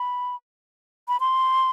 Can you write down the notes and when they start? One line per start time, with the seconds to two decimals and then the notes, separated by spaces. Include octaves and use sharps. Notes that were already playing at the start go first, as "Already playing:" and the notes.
Already playing: B5
1.08 B5
1.20 C6